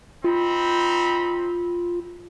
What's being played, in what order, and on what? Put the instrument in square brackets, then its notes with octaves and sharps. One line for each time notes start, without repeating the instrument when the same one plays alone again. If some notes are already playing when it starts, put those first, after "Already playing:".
[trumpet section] C4 D#4 B5 [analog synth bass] F4